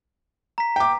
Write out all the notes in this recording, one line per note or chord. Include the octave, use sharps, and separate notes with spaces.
A#5 B6
G5 D6